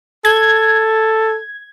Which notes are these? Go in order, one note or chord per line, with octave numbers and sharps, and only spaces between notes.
A4 G#6